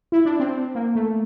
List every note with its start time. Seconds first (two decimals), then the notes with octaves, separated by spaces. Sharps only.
0.12 E4
0.25 D4
0.40 C4
0.75 A#3
0.95 A3